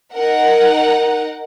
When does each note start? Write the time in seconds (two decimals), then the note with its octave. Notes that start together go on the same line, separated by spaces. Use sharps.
0.13 D#4 A#4 F#5